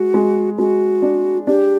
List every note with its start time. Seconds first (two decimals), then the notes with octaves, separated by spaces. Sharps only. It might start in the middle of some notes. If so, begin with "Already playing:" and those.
Already playing: G#3 F#4
0.14 G#3
0.58 G#3 F#4
1.02 D4
1.47 D4 G4